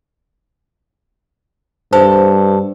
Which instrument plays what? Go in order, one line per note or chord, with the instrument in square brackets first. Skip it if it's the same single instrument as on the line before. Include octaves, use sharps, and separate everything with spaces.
[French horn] G2 [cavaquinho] A4 [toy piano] C5